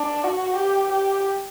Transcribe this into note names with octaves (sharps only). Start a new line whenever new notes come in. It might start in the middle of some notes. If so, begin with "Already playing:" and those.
Already playing: D4
F#4
G4
G4